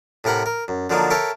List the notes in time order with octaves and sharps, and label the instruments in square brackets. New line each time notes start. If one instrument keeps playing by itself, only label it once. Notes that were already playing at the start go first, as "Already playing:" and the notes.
[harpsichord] A2 C3 A#4 F#5 B5
A#4
F#2
D3 F3 F#3 A#3 D4 D#4
A4 A#4 C#5 E5 G5